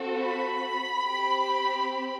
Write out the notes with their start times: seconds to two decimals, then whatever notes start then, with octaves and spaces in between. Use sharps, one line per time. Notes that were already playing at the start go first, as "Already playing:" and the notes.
Already playing: C4 F#4 A4
0.21 B5
1.06 C4 G4